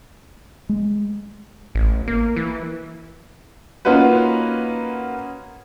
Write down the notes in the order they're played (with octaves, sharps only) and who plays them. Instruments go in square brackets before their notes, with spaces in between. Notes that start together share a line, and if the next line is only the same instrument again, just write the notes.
[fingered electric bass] G#3
[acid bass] A1
A#3
E3
[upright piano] A#3 C#4 D#4 F4 F#4 B4